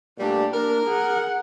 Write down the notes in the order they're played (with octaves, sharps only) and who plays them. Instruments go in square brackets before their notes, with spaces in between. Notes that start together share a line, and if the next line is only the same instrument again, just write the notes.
[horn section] A#2 G3 D4 [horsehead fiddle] A3 G4
[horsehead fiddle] A#3 D4 [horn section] A#4
[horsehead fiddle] G#4 F#5